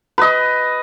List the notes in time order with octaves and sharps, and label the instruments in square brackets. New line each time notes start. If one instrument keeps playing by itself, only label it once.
[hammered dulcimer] B4 D#5